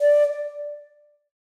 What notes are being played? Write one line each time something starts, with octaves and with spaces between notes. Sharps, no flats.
D5